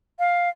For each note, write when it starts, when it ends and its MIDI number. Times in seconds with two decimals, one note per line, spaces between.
0.19 0.49 77